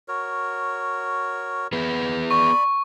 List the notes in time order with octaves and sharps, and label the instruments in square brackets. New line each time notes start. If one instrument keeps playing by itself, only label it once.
[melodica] F#4 A#4 C#5
[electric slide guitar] B3 G#4 B4
[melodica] D5 B5 [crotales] C#6